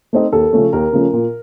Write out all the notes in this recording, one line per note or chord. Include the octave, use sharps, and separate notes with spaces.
A3 C4 D#4
D#2 A4
C#3 F3 A3 C#4
D#2 A#4
C#3 F3 A3 C#4
A#2